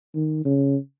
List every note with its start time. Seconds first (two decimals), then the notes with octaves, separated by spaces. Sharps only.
0.15 D#3
0.45 C#3